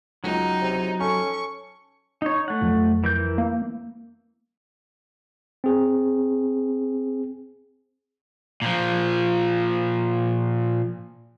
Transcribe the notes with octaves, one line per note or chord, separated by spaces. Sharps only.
C#2 F#3 D#4
C3
C#4 A4 C#6
D#4 C#5
A3 F#5
F2 F3 F#3
E3 A#4 G6
A#3
C4 G#4
A#2 F3